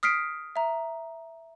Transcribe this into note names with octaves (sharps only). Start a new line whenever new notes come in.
D#6 F6 B6 C7 D7
E5 A#5